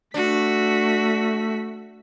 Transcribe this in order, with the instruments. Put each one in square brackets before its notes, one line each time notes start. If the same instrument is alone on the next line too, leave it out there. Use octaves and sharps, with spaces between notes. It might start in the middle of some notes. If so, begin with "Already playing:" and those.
[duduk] A3 [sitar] D4 [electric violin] F#4 B6